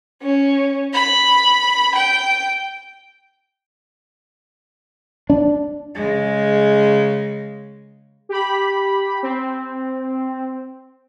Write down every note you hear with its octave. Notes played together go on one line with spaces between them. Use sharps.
C#4
B5
G5
D4
C#3 G#3
G4 B5
C4